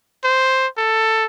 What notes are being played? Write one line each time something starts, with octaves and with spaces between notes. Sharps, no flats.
C5
A4